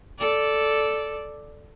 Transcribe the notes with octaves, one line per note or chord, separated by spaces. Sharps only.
A4 D5